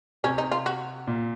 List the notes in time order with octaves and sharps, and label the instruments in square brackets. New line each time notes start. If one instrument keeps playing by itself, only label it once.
[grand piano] C3 [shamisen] C#4
[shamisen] D#4
F4
F#4
[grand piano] A#2